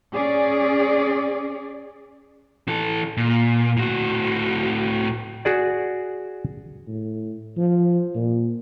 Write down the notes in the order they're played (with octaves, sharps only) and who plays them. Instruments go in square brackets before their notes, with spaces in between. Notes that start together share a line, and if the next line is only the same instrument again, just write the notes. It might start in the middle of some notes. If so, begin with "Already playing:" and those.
[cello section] C#4 G#4 D5
[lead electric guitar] E3 A4
A#2
A2 F#4
[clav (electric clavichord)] F#4 G#4 D5
[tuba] A2
F3
A#2